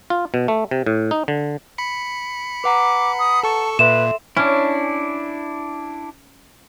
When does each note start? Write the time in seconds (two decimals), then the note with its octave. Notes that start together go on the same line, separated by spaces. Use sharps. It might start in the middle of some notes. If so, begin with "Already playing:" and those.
0.10 F4
0.34 B2
0.48 A3
0.71 C3
0.86 A2
1.11 D#4
1.28 D3
1.78 B5 C#7
2.64 B4 F#5 A#5 D6
3.19 D#6
3.44 A4 A5 C#6
3.79 A#2 A4 B4 E5 C6 E7
4.37 C#4 D4 E4